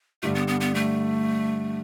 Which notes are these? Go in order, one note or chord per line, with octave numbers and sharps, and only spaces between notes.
G2 D3 G3 A3
B3
B3
B3
A3